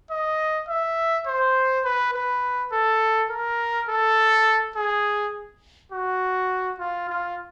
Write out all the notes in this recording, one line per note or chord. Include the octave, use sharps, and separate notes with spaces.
D#5
E5
C5
B4
B4
A4
A#4
A4
G#4
F#4
F4
F4